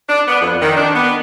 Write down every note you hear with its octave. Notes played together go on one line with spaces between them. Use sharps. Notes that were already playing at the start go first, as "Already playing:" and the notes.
D4
B3
F2
D#3
D4
B3